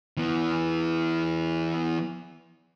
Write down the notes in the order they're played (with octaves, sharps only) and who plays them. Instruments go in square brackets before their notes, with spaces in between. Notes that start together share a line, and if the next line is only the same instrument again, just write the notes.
[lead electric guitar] E3 B3